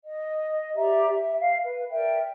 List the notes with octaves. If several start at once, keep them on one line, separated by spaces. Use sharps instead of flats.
D#5
G4 D5 E5 A#5
E5
F5
B4
A#4 D5 E5 G5